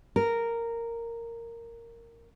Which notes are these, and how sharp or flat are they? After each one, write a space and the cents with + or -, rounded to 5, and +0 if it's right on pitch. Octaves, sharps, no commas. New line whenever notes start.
A#4 -10